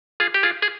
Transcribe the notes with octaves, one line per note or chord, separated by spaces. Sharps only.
F4 G#4
G4
F4 G#4
G#4